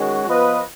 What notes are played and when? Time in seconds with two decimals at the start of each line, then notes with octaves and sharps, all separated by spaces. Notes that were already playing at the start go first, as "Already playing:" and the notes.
Already playing: D#3 G#3 C#4 F#4
0.25 F3 B3 F4 B4 D#5